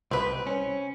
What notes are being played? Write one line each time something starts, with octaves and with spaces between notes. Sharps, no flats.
C2 C4 B4
C#4